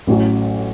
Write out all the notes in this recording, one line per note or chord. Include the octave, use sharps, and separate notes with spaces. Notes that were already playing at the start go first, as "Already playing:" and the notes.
A1 A2 F#3 C#4